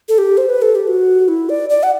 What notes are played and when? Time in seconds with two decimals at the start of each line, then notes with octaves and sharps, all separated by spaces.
0.09 A4
0.18 G4
0.37 C5
0.49 B4
0.62 A4
0.75 G4
0.88 F#4
1.28 E4
1.49 D5
1.70 D5
1.83 F#5